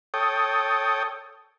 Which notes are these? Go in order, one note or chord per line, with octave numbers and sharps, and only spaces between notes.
A4 C#5 G5 D#6